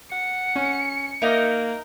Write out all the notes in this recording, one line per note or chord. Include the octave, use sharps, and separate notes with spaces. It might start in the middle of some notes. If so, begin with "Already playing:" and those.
F#5 C#7
C#4
A#3 D#4 A#4 E5